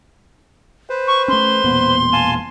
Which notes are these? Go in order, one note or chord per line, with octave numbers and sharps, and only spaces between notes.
B4 C5
C#6
A3 C#4 C6
E1 A#2 B3
F5 G#5 A5